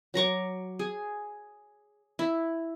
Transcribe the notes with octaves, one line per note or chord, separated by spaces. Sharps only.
F#3 A#5 C#6 D6
G#4
E4